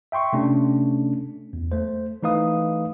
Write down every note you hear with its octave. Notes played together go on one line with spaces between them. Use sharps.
E5 G5 C6 C#6
C3 A3 C#4 D4
E2
A3 C5
E3 A3 D#4 B4 F5 D#6